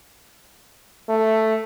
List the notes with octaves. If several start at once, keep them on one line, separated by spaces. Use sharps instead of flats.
A3